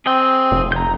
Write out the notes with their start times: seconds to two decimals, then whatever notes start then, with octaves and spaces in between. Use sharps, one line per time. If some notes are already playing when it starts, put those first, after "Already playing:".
0.06 C4 G#4 D#5 G5
0.51 F1
0.72 A#5 G6